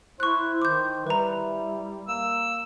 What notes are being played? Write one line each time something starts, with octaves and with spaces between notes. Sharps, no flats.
E4 C5 C#6 F#6
D#3 D6 G6
G3 E4 B4 A#5
A#3 E6